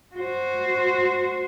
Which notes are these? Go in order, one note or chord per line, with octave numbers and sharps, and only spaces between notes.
F#4 C5